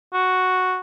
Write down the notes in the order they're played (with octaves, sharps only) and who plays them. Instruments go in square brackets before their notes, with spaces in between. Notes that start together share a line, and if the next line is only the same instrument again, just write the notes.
[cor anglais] F#4